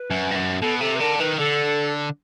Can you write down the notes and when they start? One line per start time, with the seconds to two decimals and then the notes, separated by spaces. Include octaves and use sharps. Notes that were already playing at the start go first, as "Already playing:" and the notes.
Already playing: B4
0.10 F#2
0.31 G2
0.35 F#2
0.61 B2 A4
0.80 C3 A4
0.96 B4
1.00 D3 A#4
1.19 D#3 B4
1.38 D3 A4